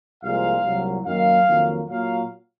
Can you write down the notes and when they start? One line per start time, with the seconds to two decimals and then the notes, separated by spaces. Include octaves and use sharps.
0.23 C2 A#2 F3 G#3 F5
0.64 C2 A#2 F#3
1.06 F#2 D#3 A#3 F5
1.48 F2 D#3 F#3 A#3
1.89 A#2 F#3 A#3 F5